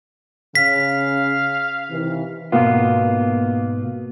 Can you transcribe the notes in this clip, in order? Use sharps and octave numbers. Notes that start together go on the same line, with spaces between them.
C#3 F5 B6
C3 D#3 E3
G#2 B2 A#3 B3 F4